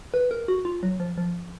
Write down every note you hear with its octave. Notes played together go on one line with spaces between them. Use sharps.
B4
A#4
F#4
F4
F#3
F3
F3